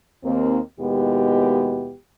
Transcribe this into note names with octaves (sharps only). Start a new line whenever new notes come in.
D#2 A#3 C4
D#2 B2 G#3 B3 E4 G4